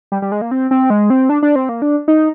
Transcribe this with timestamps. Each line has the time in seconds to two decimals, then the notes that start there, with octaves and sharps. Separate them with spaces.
0.12 G3
0.22 G3
0.32 G#3
0.41 A#3
0.51 C4
0.71 C4
0.90 G#3
1.10 C4
1.29 D4
1.43 D4
1.56 C4
1.69 A#3
1.82 D4
2.08 D#4